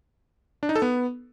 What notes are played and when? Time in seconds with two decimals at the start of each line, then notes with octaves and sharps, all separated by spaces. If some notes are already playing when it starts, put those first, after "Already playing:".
0.63 D4
0.69 D#4
0.76 A4
0.82 B3